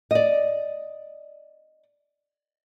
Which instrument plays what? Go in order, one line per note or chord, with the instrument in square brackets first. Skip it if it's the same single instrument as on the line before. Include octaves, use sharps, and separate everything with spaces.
[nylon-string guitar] D5 D#5